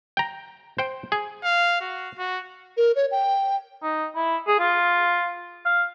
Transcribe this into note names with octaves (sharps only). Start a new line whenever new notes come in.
G5 A#5
C5 G5
G#4
F5
F#4
F#4
A#4
C#5
G5
D#4
E4
G#4
F4
F5